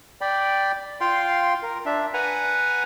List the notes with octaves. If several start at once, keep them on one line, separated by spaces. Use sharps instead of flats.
D5 G5 B5
F4 F5 G5 C6
A#4
D4 E5
B4 F#5 G#5 A#5